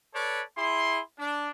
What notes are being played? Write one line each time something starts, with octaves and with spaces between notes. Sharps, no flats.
A4 B4 C#5 D5
E4 G#4 C6
D4